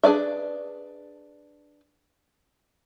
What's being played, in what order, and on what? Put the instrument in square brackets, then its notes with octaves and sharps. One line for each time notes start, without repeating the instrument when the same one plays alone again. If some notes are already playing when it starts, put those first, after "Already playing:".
[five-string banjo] D4 G#4 B4 D5 E5